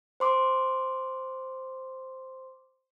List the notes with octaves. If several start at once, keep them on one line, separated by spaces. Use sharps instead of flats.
C5 C6 D6